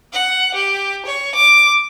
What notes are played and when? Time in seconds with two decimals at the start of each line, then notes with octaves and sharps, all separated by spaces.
0.13 F#5
0.55 G4
1.06 C#5
1.35 D6